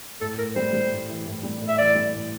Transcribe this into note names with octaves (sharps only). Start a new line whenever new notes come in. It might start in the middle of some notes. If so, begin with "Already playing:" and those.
A2 A4
A2 A#4
G3 C5
G3
A2
E3
A2
G3
A2
E5
E3 D5
G3
A2